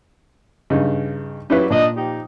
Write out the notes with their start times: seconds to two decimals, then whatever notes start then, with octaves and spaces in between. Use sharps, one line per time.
0.70 G2 C#3 D#4
1.50 F#3 G3 A#3 C#4 E4 B4
1.70 A#2 D4 D#5
1.96 F3 D#4 G4